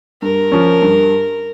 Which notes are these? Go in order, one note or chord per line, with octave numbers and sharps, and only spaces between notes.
G2 A#4
F3 C#4
G2